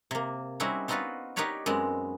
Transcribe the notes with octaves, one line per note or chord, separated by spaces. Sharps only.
C3 A#3
G3 C4 C#4 D#4 E4 F#4
B3 C4 D#4 F4 F#4 B4
D#4 G4 A#4 B4 C#5 D5
F#2 G#3 B3 C4